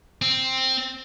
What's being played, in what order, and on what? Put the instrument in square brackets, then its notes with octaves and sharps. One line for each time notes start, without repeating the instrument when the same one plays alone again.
[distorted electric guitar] C4